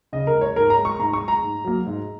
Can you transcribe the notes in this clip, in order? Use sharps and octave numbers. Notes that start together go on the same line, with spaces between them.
C#3 D#5
A#4
G#3
C#5
G#2 A#4
A#5
G#3
C#6
G#2 A#5
C#6
G#3
A#5
G#2
F#3 A#3
G#2